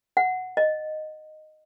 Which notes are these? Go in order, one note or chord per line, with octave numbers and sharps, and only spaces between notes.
F#5
D#5